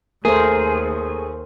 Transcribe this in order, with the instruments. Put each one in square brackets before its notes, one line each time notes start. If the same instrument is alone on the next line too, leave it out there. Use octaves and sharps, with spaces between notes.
[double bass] D#2 [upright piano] A3 [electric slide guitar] G#4 [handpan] A#4 C5